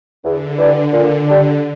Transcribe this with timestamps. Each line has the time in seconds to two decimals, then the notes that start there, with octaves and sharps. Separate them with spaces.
0.24 E2 D3
0.58 E3 G3 D4
0.92 A#2
1.27 G3 D4